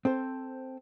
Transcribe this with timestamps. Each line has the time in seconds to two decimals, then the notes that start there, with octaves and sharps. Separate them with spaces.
0.05 C4 A4 C5